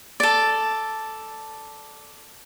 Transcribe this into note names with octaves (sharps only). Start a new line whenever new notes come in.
A4 D5